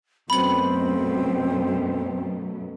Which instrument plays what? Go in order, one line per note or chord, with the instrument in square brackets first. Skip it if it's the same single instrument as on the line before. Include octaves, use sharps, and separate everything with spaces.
[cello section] F#2 B2 A3 [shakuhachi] C4 [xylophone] B5 F#7